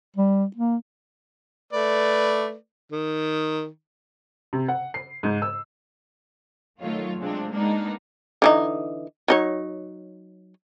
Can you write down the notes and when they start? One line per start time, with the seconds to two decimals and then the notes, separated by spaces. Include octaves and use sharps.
0.16 G3
0.56 A#3
1.73 A3 B4 D5
2.92 D#3
4.53 C3
4.68 F#5
4.94 C7
5.23 G#2
5.42 E6
6.82 D#3 F#3 A3 F4 C#5
7.19 C3 G#3 C4 D4 F4
7.52 G#3 A#3 B3 D4 D#4
8.42 D3 E3 D#4
9.28 F#3 D#4 C#5